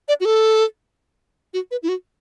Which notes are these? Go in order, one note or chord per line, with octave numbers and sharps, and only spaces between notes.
D5
F#4
A4
F#4
B4
E4
F#4